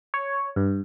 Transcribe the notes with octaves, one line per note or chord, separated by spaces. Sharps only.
C#5
G2